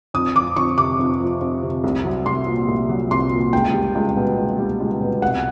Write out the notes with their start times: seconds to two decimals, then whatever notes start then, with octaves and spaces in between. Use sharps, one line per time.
0.14 F2 D#6
0.36 F3 D6
0.56 F2 C#6
0.78 C3 D6
0.99 F2
1.20 F3
1.41 F2
1.63 C3
1.84 C2
2.05 F#3
2.26 C2 C6
2.47 A#2
2.68 C2
2.89 F#3
3.11 C2 C6
3.31 A#2
3.53 C#2 G5
3.74 G3
3.95 C#2
4.16 B2
4.38 C#2
4.59 G3
4.80 C#2
5.01 B2
5.22 C2 F#5